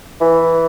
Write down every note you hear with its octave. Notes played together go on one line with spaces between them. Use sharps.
E3